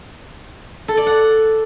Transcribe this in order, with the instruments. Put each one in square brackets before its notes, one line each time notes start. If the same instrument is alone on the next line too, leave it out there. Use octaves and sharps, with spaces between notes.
[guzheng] A4
D5
F#5